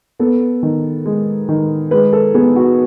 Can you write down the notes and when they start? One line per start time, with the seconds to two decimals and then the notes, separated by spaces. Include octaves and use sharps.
0.19 B3 A4
0.63 D#3
1.05 G#3
1.49 D#3
1.91 G#3 B4
2.13 A4
2.34 B3 G#4
2.56 F#4